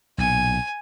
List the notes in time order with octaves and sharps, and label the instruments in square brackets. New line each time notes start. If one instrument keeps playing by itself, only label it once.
[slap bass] B1 A#2 [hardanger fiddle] G#5